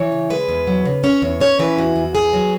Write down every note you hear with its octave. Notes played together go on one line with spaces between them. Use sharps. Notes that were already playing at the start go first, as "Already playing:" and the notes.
Already playing: E3 C#5
C#3
G#3 B4
E2
F#3
C#3
C#4 C#5
E2
C#4 C#5
E3 B4
E2 F#4
E2
B3 G#4
F#3